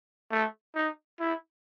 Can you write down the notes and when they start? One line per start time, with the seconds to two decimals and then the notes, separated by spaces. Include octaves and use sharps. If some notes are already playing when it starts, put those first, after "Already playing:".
0.31 A3
0.75 D#4
1.20 E4